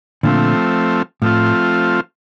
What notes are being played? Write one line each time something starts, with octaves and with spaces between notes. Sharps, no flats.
A#2 D3 F3 A3 C4
A2 F3 A3 C4 F4